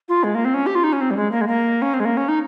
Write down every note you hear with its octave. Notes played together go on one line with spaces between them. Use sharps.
F4
G#3
A#3
C4
C#4
G4
F4
D#4
C#4
C4
G3
G#3
A#3
G#3
A#3
C#4
C4
G#3
A#3
C#4
D#4